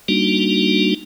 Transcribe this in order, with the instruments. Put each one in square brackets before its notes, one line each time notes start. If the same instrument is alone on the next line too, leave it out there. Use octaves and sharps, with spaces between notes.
[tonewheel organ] G3 A#3 D4 D#4 F#4